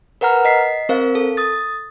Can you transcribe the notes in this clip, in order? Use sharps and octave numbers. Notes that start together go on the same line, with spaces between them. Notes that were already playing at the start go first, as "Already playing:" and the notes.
A#4 B4 F#5 A#5 F6
D#5 B6 C7
C4 A#4 C5 F5
A4
D#6 A6